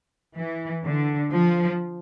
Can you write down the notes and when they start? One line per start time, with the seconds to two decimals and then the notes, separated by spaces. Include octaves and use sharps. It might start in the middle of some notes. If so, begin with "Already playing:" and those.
0.36 E3
0.84 D3
1.33 F3